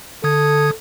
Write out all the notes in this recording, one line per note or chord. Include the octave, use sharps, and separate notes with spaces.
D3 A4 D#6 G#6